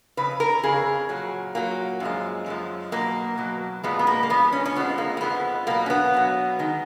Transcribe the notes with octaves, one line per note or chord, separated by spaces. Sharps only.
F2 C#3 B4
A#4
F2 C#3 G#4
A#2 F#3
A#2 F#3 A#3
F#2 F3 G#3
F#2 F3 G#3
B2 F#3 A#3
B2 F#3
A#2 F3 G#3 B3
B3
A#3
A#3
A#2 F3 G#3 B3
C#4
C#4
F2 F3 G#3 B3
A#3
A#3
F2 F3 G#3 B3
B2 F#3 A#3
C#4
B3
B2 F#3
D#3 G#3